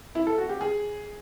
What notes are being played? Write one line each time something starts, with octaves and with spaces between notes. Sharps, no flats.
E4
A4
F#4
G4
G#4